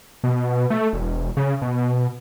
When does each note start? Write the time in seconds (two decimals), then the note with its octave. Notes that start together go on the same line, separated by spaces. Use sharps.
0.24 B2
0.70 A3
0.93 E1
1.37 C#3
1.62 B2